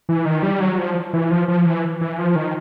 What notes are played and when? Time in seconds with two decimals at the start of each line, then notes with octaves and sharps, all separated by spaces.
0.09 E3
0.25 D#3
0.43 G3
0.60 F#3
0.78 F3
1.13 E3
1.31 F3
1.48 F3
1.66 E3
2.01 E3
2.18 F3
2.36 D#3